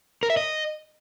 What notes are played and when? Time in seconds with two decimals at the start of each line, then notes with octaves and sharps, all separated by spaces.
0.23 A#4
0.30 E5
0.37 D#5